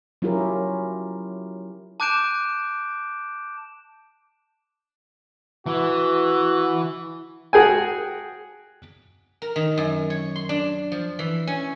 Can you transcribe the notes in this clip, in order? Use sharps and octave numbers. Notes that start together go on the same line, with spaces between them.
F#3 C#4 E4 F4 G4 A#4
A5 D6 F#6 G6 D7 E7
E3 F#4
F#4 G#4 G5 G#5
A#4
D#3
F#2
C#5
C6
D4
F3
E3
C#4